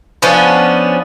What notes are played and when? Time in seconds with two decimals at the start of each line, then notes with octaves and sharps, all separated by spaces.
0.22 F3 B3 C#4 D4